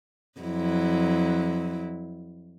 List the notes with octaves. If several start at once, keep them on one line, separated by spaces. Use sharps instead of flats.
F2 F#3 E4